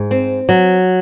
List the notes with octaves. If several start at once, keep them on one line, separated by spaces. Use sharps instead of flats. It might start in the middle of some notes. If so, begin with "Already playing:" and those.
Already playing: G#2
C4
F#3